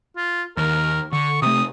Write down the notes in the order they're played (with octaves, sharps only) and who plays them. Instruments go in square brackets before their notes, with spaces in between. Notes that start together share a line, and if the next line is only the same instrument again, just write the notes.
[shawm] F4
[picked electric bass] D#2 [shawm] A#4
[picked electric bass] D3 [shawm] C#6
[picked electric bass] C3 A3 [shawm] D#6